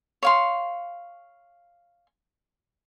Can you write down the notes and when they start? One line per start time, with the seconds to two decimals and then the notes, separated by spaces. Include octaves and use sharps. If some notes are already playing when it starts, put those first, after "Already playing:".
0.23 C#5 F5 C6